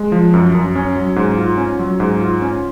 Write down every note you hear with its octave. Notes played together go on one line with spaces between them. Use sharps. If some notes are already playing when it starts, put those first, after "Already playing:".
Already playing: G#3
F3
F#2
F#2
C#4
F#3
G#2
F4
C#4
F#3
G#2
F4
C#4